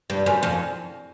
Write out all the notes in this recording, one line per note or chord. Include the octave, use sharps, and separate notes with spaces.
G2
F#2
F2